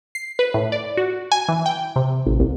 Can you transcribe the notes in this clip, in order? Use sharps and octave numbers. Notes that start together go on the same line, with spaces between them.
C7
B4
A2
D5
F#4
G#5
E3
G5
C3
A1
C2